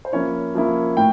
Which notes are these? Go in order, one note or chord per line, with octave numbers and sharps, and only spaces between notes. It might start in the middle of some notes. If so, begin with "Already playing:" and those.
C5
F3 A#3 C#4 E4 C#5
F3 A#3 C#4 E4
A2 G5